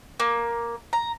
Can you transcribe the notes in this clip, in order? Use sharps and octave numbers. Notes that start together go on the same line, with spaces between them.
A#3
A#5